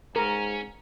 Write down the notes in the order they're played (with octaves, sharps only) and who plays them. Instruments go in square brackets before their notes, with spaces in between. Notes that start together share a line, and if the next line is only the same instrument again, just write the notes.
[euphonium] G#2 [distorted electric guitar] C#4 [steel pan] A#4